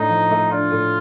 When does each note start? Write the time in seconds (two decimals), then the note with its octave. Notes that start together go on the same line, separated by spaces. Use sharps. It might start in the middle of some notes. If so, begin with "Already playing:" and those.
Already playing: A2 D4 D#4
0.09 F3
0.31 A3
0.52 D4 F4
0.72 A2